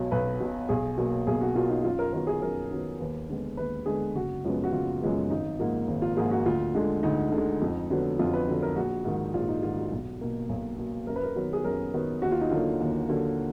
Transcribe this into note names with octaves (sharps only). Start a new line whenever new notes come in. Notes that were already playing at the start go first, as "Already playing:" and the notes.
Already playing: B1 B2 F#3
B1 B4
B2 F#3
B1 G#4
B2 F#3 A#3
B1 G#4
F#4
B2 F#3 A#3 F4
D#4
F#2 F4
A#4
D#3 F#3 B3 A#4
G#4
F#2 A#4
D#3 F#3 B3
D#2 B4
D3 G#3 B3
D#2 B4
D3 G#3 B3 G#4
F#1 F#4
F#2 F3 G#3 B3
F#4
F#1 F4
F#2 F3 G#3 B3
G#1 D#4
G#2 F3 A#3
G#1
F4
G#2 F3 A#3 G#4
F#4
D2 F4
D3 G#3
D2 D#4
D3 G#3
F2
D3 F#3 B3
F2 F4
B4
D3 F#3 B3
A#4
A#1 F#4
G#2 D#3
A#1 F4
D#4
G#2 D#3 F4
F#4
B1
B2 A#3
B1
B2 A#3
F#2 A#4
B4
A#4
D#3 F#3 B3
G#4
F#2 A#4
D#3 F#3 B3
D#2 F#4
F4
D#4
D3 F#3 A#3 F4
D#2
D3 F#3 A#3